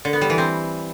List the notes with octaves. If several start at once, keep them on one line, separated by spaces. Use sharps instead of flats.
D3
B3
G3
E3
C4